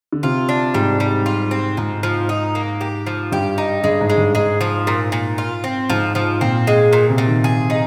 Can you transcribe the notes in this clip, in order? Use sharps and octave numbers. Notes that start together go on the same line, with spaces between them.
D3
C3 F4
D4
G#2 G3
G3
F4
C4
G#2 F3
F3
D#4
A#3
G4
F3
G2 G4
D#4
G2 G#3
G#2
G#3
G2
G#2 G#3
F3
A#2
A#2
F4
C4
G#2 F3
F3
A#2 C4
G#3
A#2
C3
A#2
D#3
G#4
D#4